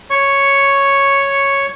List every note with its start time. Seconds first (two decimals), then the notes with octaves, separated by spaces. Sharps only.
0.10 C#5 C#6